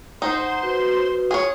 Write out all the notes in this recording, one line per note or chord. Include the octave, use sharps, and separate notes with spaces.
D#4 C5 F#5 C6
F#4 B4
G#4 C#5